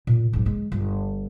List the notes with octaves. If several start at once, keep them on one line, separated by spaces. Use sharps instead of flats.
A#2
G#2 F#3
C#3 G#3
G1